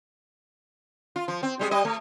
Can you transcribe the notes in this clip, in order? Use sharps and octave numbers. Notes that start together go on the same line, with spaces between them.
F4
F3
C4
G3 G#3 G#4
G3 D#5
A3